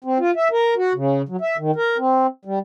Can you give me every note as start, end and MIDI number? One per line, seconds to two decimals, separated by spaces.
0.04 0.18 60
0.20 0.31 65
0.36 0.48 76
0.52 0.74 70
0.77 0.93 66
0.95 1.22 49
1.29 1.37 54
1.41 1.57 76
1.58 1.71 51
1.76 1.97 70
1.98 2.27 60
2.45 2.59 55